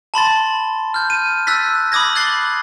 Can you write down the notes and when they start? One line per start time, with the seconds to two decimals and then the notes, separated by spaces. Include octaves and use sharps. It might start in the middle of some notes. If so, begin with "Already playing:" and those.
0.14 A5 B5 C6 A6
0.94 F6 G6
1.10 D#7
1.47 E6 F#6 A6 B6
1.92 B5 D6 D#6 G#6 A#6
2.15 F#6 G#6 A6 C7 F#7 G7